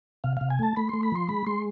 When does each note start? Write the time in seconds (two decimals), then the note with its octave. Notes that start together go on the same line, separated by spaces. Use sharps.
0.24 C3 F5
0.37 C3 F5
0.50 G#5
0.59 A3 A5
0.76 A3 B5
0.89 A3 C6
1.03 B5
1.12 F3 C6
1.29 G#3 B5
1.46 G#3 C6